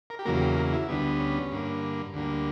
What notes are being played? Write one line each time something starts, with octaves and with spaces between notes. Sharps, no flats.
A#4
G4
E2 C#3 F#3 A#3 A#4
G4
A#4
E4
D2 D3 G3 B3
C#4
G2 D3 A#3
D2 D3 G3 A#3